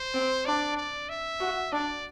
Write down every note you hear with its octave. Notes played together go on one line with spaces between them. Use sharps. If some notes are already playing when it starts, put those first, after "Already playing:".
Already playing: C5
C4
D4 D5
D5
E5
F#4
D4 D5